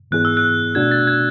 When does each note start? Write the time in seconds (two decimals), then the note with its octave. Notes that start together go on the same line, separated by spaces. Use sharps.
0.11 G#2 E3 B3 E4 G#4 F#6
0.25 E6
0.37 F#6
0.75 B2 A3 D4 F#4 G#6
0.91 A6
1.07 G#6